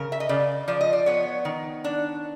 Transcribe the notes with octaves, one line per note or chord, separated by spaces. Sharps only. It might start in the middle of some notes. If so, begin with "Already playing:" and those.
Already playing: C#3 A#4
E5
D#5
C#3 D5
F3 D5
D#5
D5
B3 C#5
D#3
D4